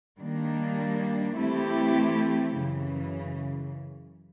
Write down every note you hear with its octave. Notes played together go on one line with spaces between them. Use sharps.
D#3 G3 A#3 D4
E3 A3 C4 E4 G4
F#2 C#3 E3